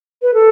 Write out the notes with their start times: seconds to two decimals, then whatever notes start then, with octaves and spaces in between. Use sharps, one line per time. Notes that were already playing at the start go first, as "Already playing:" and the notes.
0.22 B4
0.34 A4